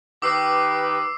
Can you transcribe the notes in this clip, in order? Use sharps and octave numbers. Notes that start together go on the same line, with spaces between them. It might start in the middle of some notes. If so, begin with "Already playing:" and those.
D#3 G4 B4 D6 E6 C7